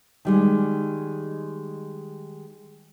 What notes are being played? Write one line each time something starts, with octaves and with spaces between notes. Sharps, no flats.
D#3 G3 G#3